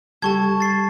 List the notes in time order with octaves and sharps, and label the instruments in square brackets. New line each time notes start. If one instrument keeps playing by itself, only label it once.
[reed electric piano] C#2 G3 G4 [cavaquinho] A4 [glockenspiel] A5 C#6 G#6
[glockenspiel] A6 C7